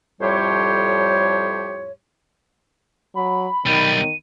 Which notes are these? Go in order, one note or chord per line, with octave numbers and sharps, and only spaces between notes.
F2 A2 G3 G4 C5 C#5
F#3 B5
B1 D#3 G3 D#7